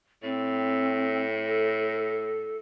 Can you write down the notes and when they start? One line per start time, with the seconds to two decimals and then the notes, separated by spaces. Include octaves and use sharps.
0.23 A2 C4
1.46 A4